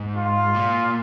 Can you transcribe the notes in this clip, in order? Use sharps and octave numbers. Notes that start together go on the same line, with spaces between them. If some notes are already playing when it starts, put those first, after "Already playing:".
Already playing: G#2
F4
A#2